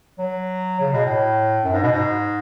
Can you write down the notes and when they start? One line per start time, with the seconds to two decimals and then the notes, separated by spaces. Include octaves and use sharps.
0.19 F#3
0.80 C#3
0.93 B2
1.05 A2
1.64 F#2
1.73 G#2
1.83 B2
1.92 G#2